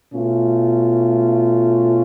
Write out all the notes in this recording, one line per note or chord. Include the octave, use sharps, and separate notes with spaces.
B2 A3 C#4 F4